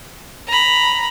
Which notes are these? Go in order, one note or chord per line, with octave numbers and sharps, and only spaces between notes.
A#5 B5